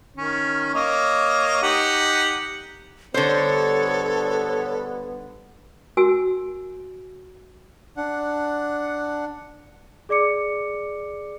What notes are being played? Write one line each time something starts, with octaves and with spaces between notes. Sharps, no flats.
D#3 C#4
A#3 C#5 D#5
D#4 G4 F#5
G2 D3 B3 A4 C5 C#5
F#4 A#4 G#5 E6
D4 F#5
G#4 D5 D6 C#7